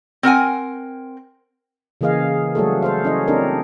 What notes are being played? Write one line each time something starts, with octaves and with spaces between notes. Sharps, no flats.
C4 A#4 F#5 G#5
C#3 E3 A#3 G#4 D#5 F5
F#3 G3 A3 F#4 G#4 A4
A4 C5 F5
C#4 E4 C#5 D#5
C4 D4 D#4 A4 A#4